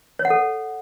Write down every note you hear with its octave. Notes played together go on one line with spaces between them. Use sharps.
C#5
F#5
A4